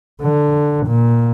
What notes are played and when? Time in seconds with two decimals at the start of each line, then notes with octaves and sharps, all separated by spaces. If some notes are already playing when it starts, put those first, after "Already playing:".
0.22 D3
0.87 A#2